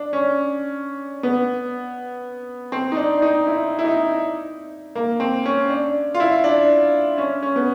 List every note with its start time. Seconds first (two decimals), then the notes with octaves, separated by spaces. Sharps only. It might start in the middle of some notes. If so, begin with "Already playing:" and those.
Already playing: D4
0.13 C#4
1.23 B3
2.72 C4
2.92 D#4
2.97 D4
3.22 D#4
3.47 E4
3.79 E4
3.85 D#4
4.95 A#3
5.20 C4
5.45 C#4
5.70 D4
6.14 F4
6.20 E4
6.44 D4
7.18 C#4
7.43 C#4
7.56 B3